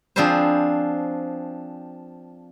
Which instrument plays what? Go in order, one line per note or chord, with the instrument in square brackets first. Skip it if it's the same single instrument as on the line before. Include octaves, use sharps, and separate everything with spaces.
[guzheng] F3 C4 D4 G#4 B4 C5